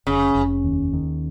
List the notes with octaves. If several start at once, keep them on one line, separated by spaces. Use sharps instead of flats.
F1 C#3
F1
D#2
D#3